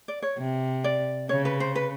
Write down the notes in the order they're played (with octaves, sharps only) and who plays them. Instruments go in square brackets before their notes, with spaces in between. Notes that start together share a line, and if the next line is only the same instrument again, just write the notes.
[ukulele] D5
C#5
[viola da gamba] C3
[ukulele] D5
[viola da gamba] C#3 [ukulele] C#5
[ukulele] B4
C5
B4